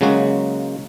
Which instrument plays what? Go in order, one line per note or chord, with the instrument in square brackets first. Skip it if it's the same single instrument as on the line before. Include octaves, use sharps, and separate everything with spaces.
[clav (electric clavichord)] C#3 F#3 G#3 A#3 F#4